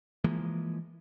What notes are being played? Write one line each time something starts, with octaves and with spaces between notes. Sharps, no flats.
E3 F3 G#3 A#3